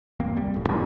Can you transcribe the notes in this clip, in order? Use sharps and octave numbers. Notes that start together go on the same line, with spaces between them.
G1 D#2 A#3 C4
C2 G3
D1 A2
A1 E2 C3